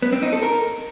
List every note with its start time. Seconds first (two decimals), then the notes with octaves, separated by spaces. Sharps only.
0.02 B3
0.13 C4
0.23 D#4
0.33 A4
0.43 A#4